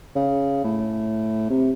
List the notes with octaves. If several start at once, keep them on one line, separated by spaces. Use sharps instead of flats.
C#3
A2
C3